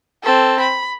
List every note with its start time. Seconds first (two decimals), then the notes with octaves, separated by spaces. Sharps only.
0.23 C4 A4
0.60 B5